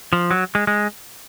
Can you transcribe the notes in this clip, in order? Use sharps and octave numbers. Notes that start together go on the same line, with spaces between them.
F3
F#3
G#3
G#3